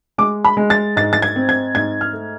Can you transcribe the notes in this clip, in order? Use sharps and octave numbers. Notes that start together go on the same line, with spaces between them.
G#3 D6
B5
G#3
A6
G#2 A6
A6
G#6
C4
G#6
G#2 G#6
F6
A3